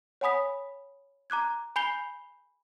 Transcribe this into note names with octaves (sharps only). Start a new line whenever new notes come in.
C#5 F#5 G#5 B5 D#6 B6
A#5 D6 F#6 G#6
G#5 B5 G6 C7 F7 G7